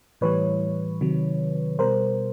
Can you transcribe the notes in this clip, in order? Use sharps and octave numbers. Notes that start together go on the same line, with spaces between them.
A2 E3 G3 B4 C#5
C3 D#3 F#3
B2 G3 A#4 C5